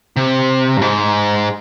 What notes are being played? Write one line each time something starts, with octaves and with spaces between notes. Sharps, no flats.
C3
G2
G#2